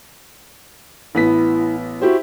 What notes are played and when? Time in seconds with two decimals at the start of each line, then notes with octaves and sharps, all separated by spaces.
1.15 A1 B3 E4 B6
2.01 E4 F#4 G4 C5